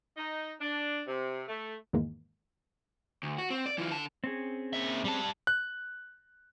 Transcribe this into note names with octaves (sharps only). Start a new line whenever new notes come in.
D#4
D4
C3
A3
E2 G#2 D#3 E3 G#3 A#3
D2
F#4
C4
D5
E3 F4
D3 A5
C4 C#4 G#4
A#2 E5
G3 A5
F#6